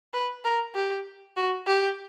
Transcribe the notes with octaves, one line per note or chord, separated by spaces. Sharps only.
B4
A#4
G4
F#4
G4